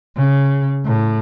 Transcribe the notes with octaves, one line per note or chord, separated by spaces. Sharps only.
C#3
A2